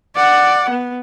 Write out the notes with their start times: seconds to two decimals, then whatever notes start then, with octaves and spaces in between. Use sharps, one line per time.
0.16 D5 F#5
0.70 B3